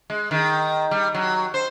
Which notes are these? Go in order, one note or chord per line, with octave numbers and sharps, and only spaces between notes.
G#3
D#3
G3
F#3
C5